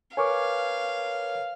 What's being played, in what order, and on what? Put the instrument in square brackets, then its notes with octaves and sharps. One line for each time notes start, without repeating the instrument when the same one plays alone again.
[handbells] A#4 B4 C#5 [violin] F5 [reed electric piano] G#5 C#6 D6